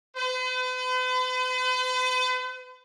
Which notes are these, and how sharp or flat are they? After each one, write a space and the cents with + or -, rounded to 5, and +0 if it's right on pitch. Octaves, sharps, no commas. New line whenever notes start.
B4 +45